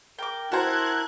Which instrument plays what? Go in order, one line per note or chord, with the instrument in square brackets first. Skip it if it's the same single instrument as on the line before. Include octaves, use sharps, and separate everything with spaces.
[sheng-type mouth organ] A#4 [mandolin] G5 D6
[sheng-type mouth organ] E4 A#4 [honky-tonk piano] F#4 C5 [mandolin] A4 A#5 [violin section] F#6 G#6